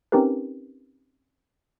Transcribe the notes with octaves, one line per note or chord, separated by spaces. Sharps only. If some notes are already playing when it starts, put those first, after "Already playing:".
C4 C#4 D#4 G4 A#4 B4